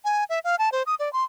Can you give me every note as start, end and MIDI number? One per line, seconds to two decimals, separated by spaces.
0.05 0.24 80
0.29 0.39 76
0.44 0.56 77
0.59 0.69 81
0.72 0.83 72
0.86 0.95 87
0.99 1.11 74
1.13 1.24 84